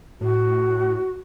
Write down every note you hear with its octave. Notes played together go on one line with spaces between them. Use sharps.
A2 F#4